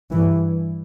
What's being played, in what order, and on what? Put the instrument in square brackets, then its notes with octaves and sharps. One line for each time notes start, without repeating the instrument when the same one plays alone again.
[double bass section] G2 E3